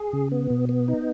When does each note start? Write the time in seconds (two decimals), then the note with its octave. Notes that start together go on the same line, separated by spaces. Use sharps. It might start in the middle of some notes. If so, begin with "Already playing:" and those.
Already playing: G#4
0.13 C#3
0.32 B3
0.50 B2
0.69 B3
0.88 D#4